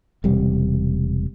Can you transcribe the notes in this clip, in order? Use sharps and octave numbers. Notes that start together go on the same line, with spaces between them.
E1 C3 G3